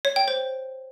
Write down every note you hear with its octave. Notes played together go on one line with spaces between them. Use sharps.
C#5
G5
C5